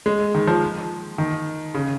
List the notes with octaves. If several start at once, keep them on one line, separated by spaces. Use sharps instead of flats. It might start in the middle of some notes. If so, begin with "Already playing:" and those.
G#3
D#3
F3
D#3
C#3